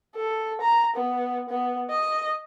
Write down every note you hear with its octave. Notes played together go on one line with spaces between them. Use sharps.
A4
A#5
B3
B3
D#5